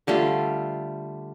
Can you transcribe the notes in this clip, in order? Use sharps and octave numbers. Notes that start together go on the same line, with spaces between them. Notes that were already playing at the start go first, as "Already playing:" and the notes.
D3 G3 A3 F4